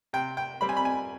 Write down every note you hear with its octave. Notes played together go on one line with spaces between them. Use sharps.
C3 G5
G5
G3 C4 B5
G#5
B5
G#5